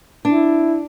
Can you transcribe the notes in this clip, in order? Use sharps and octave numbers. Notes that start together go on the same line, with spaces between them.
D4 E4